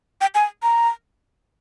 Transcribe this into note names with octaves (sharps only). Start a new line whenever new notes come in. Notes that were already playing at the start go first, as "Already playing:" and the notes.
G5
G#5
A#5